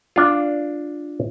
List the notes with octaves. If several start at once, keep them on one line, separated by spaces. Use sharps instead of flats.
D4 F4